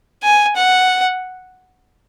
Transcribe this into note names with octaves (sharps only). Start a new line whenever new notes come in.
G#5
F#5